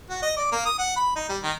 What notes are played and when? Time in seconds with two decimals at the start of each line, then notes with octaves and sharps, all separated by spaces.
0.10 F#4
0.22 D#5
0.37 D5
0.52 A#3
0.65 D#6
0.78 F#5
0.96 B5
1.15 D#4
1.29 G3
1.43 D#3